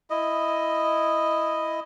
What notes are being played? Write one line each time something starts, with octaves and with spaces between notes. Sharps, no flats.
E4 D#5